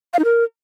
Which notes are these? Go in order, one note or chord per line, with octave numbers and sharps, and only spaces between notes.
F5
D#4
A#4